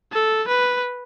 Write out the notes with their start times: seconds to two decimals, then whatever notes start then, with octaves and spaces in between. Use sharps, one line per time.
0.13 A4
0.48 B4